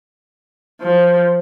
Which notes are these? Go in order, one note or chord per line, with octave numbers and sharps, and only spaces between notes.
F3